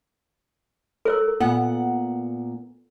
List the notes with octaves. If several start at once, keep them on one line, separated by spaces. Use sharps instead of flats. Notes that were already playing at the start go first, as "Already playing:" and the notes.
A4 A#4 C#5 E6
A#2 B3 F#5